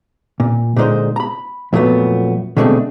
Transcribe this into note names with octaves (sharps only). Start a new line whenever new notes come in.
A#2
A#2 D3 G#3 D#4 C5
A#5 B5
F2 A#2 F#3 A3 B3
B2 D3 G#3 A3 C4 D4